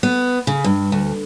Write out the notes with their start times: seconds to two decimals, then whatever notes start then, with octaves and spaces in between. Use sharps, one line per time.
0.03 B3
0.47 C#3
0.64 G2
0.92 D2